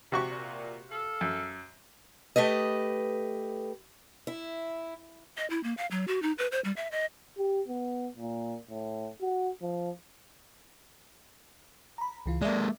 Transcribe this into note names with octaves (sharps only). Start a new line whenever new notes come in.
C3 F#4 G4 C#6
A#2
A4 F5
F#2
A3 G4 B4 D#5
E4
D#5
E4
A#3
F5
F#3
F#4
D#4
B4
C5
G3
E5
D#5
G4
B3
A#2
A2
F#4
F3
A#5 B5
C#2 E3 F4
G#3 A#3 D5 E5